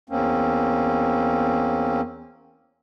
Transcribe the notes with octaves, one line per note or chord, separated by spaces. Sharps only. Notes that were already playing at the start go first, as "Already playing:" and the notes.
E2 A#3 C4 C#4